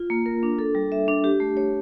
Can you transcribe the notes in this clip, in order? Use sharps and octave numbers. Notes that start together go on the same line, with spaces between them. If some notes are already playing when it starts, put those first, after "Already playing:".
Already playing: F4
A#3
A#4
D4
A4
G3
E5
D4
G4
A3
C#5